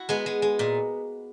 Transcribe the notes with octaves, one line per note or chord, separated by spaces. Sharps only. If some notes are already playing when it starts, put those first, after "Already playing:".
Already playing: E4 F#4
G#3 B3
G#3
G#3
A#2